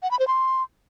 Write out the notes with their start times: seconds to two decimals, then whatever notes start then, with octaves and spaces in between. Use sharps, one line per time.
0.03 F#5
0.11 B5
0.19 C5
0.28 C6